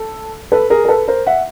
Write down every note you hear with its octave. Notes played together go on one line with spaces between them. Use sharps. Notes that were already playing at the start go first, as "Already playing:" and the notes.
Already playing: A4
A4 B4
G#4 A#4
A#4
A4 B4
A#4 C5
E5 F#5